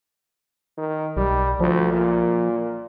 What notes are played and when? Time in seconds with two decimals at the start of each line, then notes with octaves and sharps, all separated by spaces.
0.78 D#3
1.17 B1 G3
1.60 D2 F3
1.93 A#2